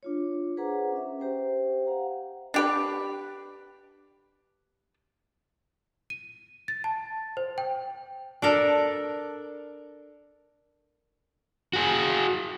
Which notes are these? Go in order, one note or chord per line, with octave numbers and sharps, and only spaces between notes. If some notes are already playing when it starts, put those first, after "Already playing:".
D4 F4 C#5
G#4 B4 C5 F#5 A#5 D6
C#4 E5
G4 C5 E5 G5
F5 F#5 A#5
D4 G4 B4
D#7
A6
A5
C5
G5
D4 A4 A#4
F#4 G#4